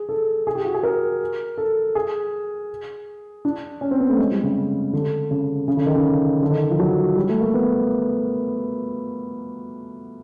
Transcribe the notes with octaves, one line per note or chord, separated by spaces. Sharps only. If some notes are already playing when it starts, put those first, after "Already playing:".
Already playing: G#4
A4
G#4
G4
F#4
G#4
A#4
A4
G#4
D4
C#4
C4
B3
A3
G#3
G3
C#3
D3
C#3
C#3
D3
D#3
C#3
D3
D#3
F3
F#3
G3
A3
A#3
B3